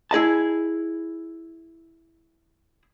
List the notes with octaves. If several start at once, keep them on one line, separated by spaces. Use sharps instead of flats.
E4 G#4 D#5 A5